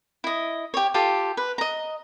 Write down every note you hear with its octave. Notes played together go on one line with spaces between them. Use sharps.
E4 D#5
G4 C#5
F4 G4 A4
B4
D#5 A#5